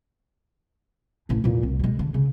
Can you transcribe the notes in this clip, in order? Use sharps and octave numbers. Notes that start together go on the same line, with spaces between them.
A1 A2
E2 A#2
C2
B2 G#3
D3
C#3